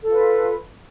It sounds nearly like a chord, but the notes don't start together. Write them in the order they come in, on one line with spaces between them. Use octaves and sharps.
A4 F4 B4